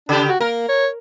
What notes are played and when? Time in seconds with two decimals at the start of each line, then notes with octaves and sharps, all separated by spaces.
0.09 C#3 D4 G4
0.29 F#4
0.41 A#3 A#4
0.69 C#5